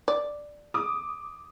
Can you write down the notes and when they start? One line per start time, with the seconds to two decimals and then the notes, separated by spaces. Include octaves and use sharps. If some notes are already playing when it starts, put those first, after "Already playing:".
0.08 D5
0.74 D6 D#6